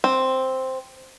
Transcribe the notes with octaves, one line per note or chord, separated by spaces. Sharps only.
C4